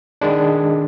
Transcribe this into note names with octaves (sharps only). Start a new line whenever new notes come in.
D#3 G#3 D4